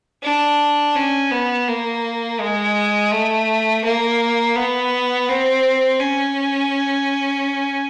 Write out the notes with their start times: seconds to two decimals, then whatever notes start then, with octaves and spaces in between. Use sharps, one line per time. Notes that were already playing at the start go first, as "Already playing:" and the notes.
0.23 D4
0.95 C#4
1.31 B3
1.68 A#3
2.40 G#3
3.12 A3
3.84 A#3
4.55 B3
5.29 C4
6.00 C#4